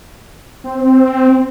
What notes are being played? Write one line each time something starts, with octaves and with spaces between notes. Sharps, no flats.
C4